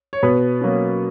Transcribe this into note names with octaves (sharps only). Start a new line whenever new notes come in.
C#5
B2 B3 B4
F#3 A#3 C#4